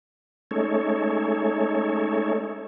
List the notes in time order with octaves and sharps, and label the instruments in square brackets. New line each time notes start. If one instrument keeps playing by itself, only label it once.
[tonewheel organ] G#3 A3 C#4 D#4 A4 C#5